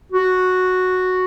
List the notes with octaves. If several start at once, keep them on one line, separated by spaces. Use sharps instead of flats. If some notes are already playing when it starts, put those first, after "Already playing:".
F#4